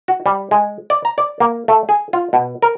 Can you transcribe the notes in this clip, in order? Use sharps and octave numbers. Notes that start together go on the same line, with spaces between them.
F#4
G3
G#3
D5
A#5
D5
A#3
A3
G#4
F4
B2
A#4